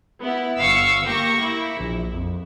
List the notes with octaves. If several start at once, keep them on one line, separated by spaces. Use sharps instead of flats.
B3 E4
G1 F5 C#6 E6 C#7
A#3 G4 C#6 A#6
E4
A#1
F2